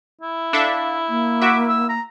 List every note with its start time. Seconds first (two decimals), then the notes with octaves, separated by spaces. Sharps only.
0.22 E4
0.53 D4 A4 E5 F5
1.09 A#3
1.41 F#4 E5 D6
1.69 E6
1.89 A#5